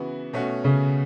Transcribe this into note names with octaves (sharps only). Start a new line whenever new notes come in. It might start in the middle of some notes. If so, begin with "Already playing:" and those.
Already playing: C#3 E3 B3 F#4
B2 A3 C#4 F#4
C#3